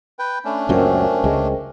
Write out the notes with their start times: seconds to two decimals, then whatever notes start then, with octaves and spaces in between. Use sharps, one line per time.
0.19 B4 G5
0.45 A3 C#4 D4
0.69 C#2 F#2 A#2 A#4 C5 G5
1.24 C#2 G#3